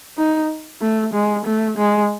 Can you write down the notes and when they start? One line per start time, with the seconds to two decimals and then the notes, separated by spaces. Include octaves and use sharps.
0.17 D#4
0.81 A3
1.14 G#3
1.45 A3
1.78 G#3